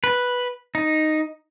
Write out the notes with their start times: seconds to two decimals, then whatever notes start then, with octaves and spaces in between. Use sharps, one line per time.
0.04 B4
0.75 D#4